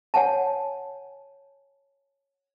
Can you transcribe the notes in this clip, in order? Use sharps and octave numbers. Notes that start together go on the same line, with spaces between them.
C#5 F#5 G#5 A5